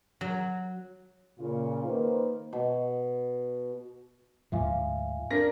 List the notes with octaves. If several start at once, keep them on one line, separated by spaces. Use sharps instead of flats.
F#3
A#2 C#3 F4
D#3 A#3 B4 C5
B2
D2 G#2 F3 E5 F5 G#5
D4 A#4 A#6